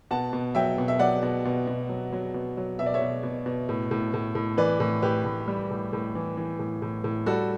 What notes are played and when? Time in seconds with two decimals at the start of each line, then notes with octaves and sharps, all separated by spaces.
0.11 B2 F#5 A5
0.33 B2
0.55 F#3 E5 G5
0.78 B2
0.88 E5
0.99 F#3 D5 F#5
1.23 B2
1.45 B2
1.67 B2
1.89 F#3
2.12 F#3
2.34 B2
2.57 F#3
2.79 B2 E5
2.86 D5
2.94 C#5 E5
3.02 B2
3.23 B2
3.46 B2
3.69 A2
3.91 A2
4.14 A2
4.35 A2
4.57 E3 B4 D5
4.80 A2
5.02 A2 G4 B4
5.25 A2
5.48 G3
5.71 A2
5.93 A2
6.15 E3
6.37 E3
6.59 A2
6.82 A2
7.04 A2
7.26 G3 F#4 A4